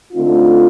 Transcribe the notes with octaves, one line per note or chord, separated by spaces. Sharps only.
D3 A3 C4 D#4 F4